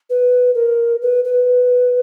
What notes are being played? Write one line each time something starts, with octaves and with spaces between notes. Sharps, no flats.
B4
A#4
B4
B4